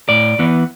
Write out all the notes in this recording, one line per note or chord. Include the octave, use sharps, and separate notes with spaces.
A2 D5
E3 B3